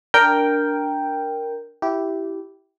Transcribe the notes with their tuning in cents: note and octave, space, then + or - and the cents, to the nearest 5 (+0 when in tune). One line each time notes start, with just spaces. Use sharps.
D4 -5 A#4 +0 G5 +0
E4 +0 G4 -15